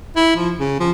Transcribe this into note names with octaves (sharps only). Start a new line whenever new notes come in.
E4
F3
C#3
F3